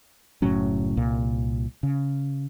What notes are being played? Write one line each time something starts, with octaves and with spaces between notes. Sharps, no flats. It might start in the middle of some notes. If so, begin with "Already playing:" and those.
F#1 A2 F#3 C#4
C2 A#2
C#3